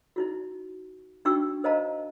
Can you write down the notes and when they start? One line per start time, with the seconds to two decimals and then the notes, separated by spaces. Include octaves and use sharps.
0.16 D#4 E4 F#4
1.25 D4 D#4 F#4 G5 C#6 E6
1.64 A#4 C5 D#5 F5 A5 A#5